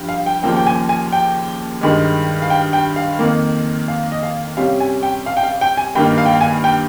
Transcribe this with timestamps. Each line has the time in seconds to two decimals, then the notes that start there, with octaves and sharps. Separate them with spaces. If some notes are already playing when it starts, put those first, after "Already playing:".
Already playing: G2 F3
0.09 F5
0.26 G5
0.43 D#2 C#3 F3 A#3 G5
0.57 G5
0.66 G#5
0.89 G#5
1.13 G5
1.81 G2 D#3 G#3
2.42 F5
2.50 G5
2.73 G5
2.96 F5
3.19 F2 D#3 A#3
3.88 F5
4.12 D#5
4.23 F5
4.57 C3 G3 C#4 F5
4.80 G#5
5.03 G5
5.26 F5
5.37 G5
5.43 F5
5.61 G5
5.77 G#5
5.95 G2 D#3 A#3 G5
6.18 F5
6.26 G5
6.33 F5
6.41 G#5
6.64 G5